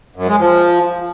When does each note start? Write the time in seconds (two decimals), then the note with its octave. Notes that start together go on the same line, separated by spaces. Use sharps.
0.16 F#2
0.28 G#3
0.39 F3